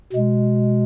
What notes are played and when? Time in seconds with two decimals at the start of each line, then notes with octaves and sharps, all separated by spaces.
0.13 B2 G#3